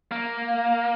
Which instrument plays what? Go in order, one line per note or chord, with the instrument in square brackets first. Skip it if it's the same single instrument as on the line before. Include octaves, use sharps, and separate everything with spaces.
[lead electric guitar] A#3